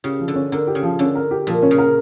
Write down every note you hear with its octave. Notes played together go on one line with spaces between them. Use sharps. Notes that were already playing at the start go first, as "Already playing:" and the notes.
C#3 G4
F3
D3
C#4
D3 A#4
G4
C#3
F3
D3 C#4
A#4
G4
A#2 F3
C#4
C#3
A#4